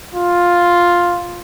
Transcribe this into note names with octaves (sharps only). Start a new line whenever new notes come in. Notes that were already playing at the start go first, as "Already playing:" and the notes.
F4